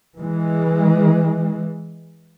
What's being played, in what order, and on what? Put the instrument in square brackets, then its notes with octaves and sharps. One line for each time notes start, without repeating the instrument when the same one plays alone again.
[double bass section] E3 G#3